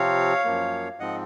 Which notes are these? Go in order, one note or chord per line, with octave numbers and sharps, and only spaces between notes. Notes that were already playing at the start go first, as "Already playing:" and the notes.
Already playing: C3 F3 C4 C#5 F5
F#2 F3 A#3
G#2 F3 C4 D#5 F#5